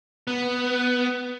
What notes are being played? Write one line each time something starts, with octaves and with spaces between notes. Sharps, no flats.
B3